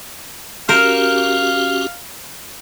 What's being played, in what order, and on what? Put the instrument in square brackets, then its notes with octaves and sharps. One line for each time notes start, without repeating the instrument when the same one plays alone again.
[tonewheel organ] C#4 F#4 G4 [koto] A#4 C5 [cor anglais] F5